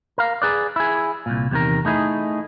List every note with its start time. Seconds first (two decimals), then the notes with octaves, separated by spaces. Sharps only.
0.18 A#4 F5
0.42 G#4 B4 D5
0.76 E4 G#4
1.26 C2 A#2
1.51 E2 C3 D#3 A#4
1.85 A3 D#4 E4 G#4